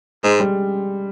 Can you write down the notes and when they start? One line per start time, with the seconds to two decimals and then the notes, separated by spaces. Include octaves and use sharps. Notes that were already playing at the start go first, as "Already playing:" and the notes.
0.24 G#2 G#3
0.40 G3